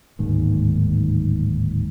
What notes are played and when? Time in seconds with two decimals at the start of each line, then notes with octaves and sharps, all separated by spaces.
0.19 D1 D#2 G#2 D#3